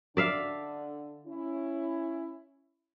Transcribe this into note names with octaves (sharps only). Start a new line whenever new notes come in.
D3 D5 E5 F5
C#4 E4